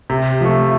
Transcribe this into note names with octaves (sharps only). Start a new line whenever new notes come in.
C3
F3 A3